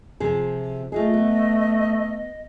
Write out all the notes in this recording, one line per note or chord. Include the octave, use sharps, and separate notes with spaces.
C3 F3 G#4
A3 F4 F#4 G#4 D#5
B3